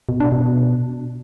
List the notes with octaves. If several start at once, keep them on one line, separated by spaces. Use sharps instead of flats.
B2
D4
B2